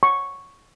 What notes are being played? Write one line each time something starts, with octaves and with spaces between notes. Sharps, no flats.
C#6